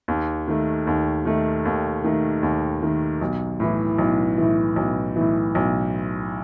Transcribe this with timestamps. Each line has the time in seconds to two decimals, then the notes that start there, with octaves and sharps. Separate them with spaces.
0.08 D#2
0.48 D#3 A3
0.87 D#2
1.25 D#3 A3
1.65 D#2
2.04 D#3 A3
2.43 D#2
2.82 D#3 A3
3.21 B1
3.60 A2 E3
3.99 B1
4.38 A2 E3
4.76 B1
5.16 A2 E3
5.55 B1